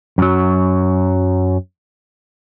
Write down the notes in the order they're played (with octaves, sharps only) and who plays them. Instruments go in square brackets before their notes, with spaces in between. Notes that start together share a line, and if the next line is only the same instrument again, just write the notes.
[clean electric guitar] F#2 F#3